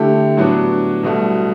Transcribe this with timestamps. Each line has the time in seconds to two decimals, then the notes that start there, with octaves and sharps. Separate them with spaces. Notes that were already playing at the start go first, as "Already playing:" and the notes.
Already playing: D3 A3 E4 G4
0.37 A2 F#3 B3 D4
1.03 C2 B2 A3